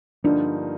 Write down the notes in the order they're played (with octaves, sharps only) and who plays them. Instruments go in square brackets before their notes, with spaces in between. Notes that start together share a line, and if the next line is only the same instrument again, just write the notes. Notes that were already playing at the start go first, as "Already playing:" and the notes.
[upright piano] G2 D3 F3 A#3 D#4 [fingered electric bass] D4